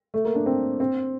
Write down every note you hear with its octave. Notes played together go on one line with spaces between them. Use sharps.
A3
A#3
D4
C4
C4